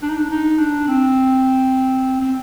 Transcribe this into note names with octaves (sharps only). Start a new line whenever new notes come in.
D4
D#4
D4
D#4
D4
C4
C4